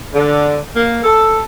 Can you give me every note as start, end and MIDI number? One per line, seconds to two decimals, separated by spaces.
0.13 0.56 50
0.75 1.03 58
1.04 1.39 69